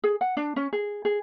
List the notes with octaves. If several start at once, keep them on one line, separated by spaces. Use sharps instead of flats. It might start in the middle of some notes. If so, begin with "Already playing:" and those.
G#4
F#5
D4
C#4
G#4
G#4